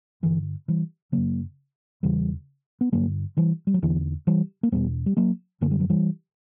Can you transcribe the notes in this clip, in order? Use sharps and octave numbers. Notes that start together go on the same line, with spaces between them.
G2 D3 E3
E3 G3
F#2 C#3 F#3 A#3
E2 C#3 E3 G3
B3
G2 D3 F#3 A#3
E3 G3
G3
F#3
E2 D3 E3
E3 G3
A#3
E2 B2 G3 B3
G3
F#3 A#3
F#2 D3 A#3
G3
F#3
E3 G3